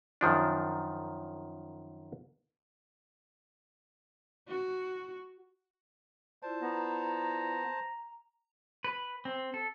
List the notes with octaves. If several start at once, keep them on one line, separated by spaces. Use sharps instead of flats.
F#2 D#3 F3 D4
F#4
E4 F4 C5 D5 A5
B3 A#5
B4
C4
A4